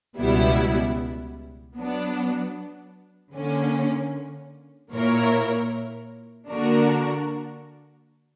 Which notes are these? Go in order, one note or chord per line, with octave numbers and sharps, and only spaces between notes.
C#2 B2 G3 B3 E4
F#3 B3 D4
D3 A#3 C#4
A#2 A#3 E4 A#4 C#5
D3 A#3 D4 F#4 A#4